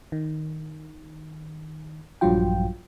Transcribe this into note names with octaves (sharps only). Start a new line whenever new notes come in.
D#3
A#1 G2 F3 F#3 F4 G5